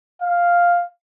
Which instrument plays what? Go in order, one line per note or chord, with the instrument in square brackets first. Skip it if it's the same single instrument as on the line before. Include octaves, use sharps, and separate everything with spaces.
[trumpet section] F5